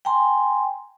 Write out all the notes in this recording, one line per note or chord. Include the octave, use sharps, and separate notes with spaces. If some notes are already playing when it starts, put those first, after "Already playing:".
G5 G#5 A#5 C6